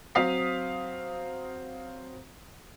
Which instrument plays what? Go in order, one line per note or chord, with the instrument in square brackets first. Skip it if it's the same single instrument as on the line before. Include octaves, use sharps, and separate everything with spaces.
[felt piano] F#3 C4 F5 D#6 B6 C7